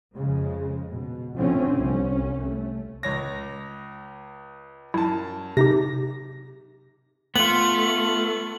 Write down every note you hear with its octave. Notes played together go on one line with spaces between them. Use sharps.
F2 C#3 G#3
B2
B2 D3 F3 A3 C4 C#4
C2 C#4
A3
C#2 C#5 A#6
F#2 E4 A5
C3 D#4 G4 A#6
A3 B3 F4 F#7